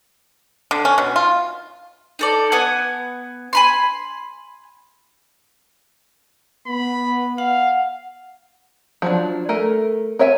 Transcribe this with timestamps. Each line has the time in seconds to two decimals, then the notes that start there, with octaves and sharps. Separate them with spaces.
0.71 D3
0.85 C#4
0.98 B2
1.16 F4
2.19 D#4 A4 D5
2.52 B3 F#5 G#5 D#6
3.53 G#5 B5 C6
6.67 B3 B5
7.38 F5 F#5
9.02 F3 F#3 D4
9.49 A3 A#4 G#5
10.19 A#4 C#5 E5 G5 G#5